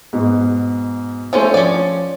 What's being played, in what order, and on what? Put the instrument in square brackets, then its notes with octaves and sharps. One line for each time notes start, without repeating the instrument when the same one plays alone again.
[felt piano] G#2 B2
[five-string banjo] F3 C#4 C5 [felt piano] A3 D4 G#5
[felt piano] F3 D6 [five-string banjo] C#4 D5